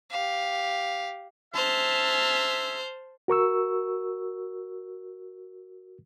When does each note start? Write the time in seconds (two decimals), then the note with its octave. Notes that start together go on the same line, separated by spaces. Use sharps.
0.10 G4 F5
1.55 G#4 C5 E5 A5 F6
3.28 F#4 A#4 C#6 E6